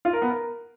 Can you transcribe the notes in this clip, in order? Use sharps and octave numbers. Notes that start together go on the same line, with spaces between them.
F4
A#4
B3
A#4